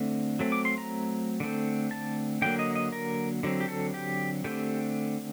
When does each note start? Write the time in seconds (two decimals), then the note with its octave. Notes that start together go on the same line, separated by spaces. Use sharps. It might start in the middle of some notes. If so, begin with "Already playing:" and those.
Already playing: D3 A3 C4
0.39 F#3 A3 C4
0.52 D6
0.65 C6
0.78 A#5
1.40 D3 A3 C4
1.91 A5
2.42 D3 F#3 A#3 G5
2.59 D#5
2.75 D#5
2.92 A#4
3.43 D3 F#3 C4
3.60 G4
3.68 A4
3.94 G4
4.44 D3 A3 C4 G4